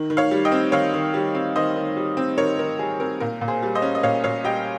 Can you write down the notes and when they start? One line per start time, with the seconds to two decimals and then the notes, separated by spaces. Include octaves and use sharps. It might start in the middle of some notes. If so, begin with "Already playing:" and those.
Already playing: D#3
0.10 D#3
0.17 C#5 F5
0.31 G3
0.45 D#5 G5
0.52 C4
0.72 D#3 C#5 F5
0.94 D#3
1.14 G3
1.35 C4
1.56 D#3 C5 D#5
1.76 D#3
1.97 G3
2.17 C4
2.38 D#3 A#4 C#5
2.59 D#3 A#4
2.79 G3 G#4
3.00 C4 A#4
3.20 A#2 A#4
3.41 A#2
3.48 G#4 C5
3.62 G3
3.75 C5 D#5
3.82 C#4
3.95 D#5
4.03 A#2 C#5 F5
4.24 A#2 C#5 F5
4.44 G3 D#5 G5